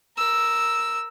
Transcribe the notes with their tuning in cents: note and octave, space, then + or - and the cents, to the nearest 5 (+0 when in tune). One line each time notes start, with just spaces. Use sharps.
A#4 +0 E6 +0